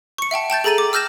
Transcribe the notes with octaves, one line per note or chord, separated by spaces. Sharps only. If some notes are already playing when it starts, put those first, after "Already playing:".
C#6 C#7
E5 F#5 G5 A5
G5 A5 G6 A6
G#4 A4 A#5 A6 D#7 F#7
D6
E6 F6 G6 A#6 E7